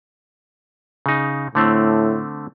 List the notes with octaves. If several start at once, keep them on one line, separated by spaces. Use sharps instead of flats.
C#3 D#4
A2 D3 A3 C4